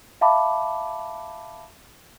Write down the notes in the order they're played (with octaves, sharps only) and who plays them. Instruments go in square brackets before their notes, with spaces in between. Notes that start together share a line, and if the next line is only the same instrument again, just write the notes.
[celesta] E5 F5 A5 B5 D6